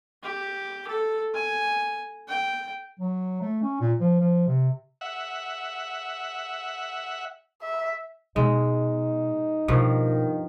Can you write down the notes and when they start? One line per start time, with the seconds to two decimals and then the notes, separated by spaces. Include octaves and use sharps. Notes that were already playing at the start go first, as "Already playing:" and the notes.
0.23 G4
0.88 A4
1.34 G#5
2.29 G5
3.00 F#3
3.41 A3
3.62 C#4
3.80 A#2
4.00 F3
4.20 F3
4.47 C3
5.01 E5 F#5
7.62 E5
8.36 B2 G#3 D#4
9.68 G2 B2 D#3 F3